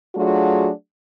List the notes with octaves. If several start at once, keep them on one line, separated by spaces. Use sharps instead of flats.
F#3 A3 D4 F4 F#4 G#4